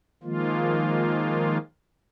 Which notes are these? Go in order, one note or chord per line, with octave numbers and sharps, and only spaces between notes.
D#3 F3 G#3 A#3 F4